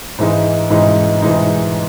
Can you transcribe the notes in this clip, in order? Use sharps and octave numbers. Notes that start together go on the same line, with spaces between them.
G#2 E3 G#3 D#4
G#2 E3 G#3 D#4
G#2 E3 G#3 D#4